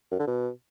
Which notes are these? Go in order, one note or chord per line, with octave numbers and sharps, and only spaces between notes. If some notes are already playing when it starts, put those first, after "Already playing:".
F#2
D3
B2